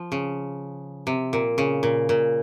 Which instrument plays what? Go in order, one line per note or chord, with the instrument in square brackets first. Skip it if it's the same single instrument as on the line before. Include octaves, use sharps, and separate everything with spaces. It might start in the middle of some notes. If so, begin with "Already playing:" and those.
Already playing: [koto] F3
C#3
C3
A#2
C#3
A#2
A#2